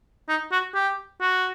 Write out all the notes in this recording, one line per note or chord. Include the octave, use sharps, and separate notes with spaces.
D#4
F#4
G4
F#4